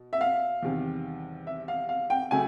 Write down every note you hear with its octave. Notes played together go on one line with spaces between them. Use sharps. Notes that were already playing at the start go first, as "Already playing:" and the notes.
Already playing: B2
E5
F5
E2 C3 D#3 G3
E5
F5
F5
G5
C#3 F#3 A3 G#5